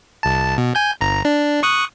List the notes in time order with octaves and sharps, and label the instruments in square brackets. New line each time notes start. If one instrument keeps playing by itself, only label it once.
[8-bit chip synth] C2 A5
B2
G#5 G6
G1 A#5
D4
C#6 D#6 F#6